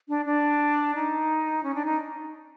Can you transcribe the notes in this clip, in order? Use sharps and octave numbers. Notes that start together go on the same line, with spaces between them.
D4
D4
D#4
C#4
D4
D#4